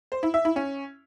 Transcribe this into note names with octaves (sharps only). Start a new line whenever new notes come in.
C5
E4
E5
E4
C#4